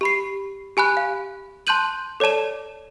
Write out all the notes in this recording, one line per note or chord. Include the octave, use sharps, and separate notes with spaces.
G4 B5 C7
G4 G#5 B5 F#6
F5
A5 C6 F#6 G6 D#7 F#7
A4 C#5 D5 A5 E7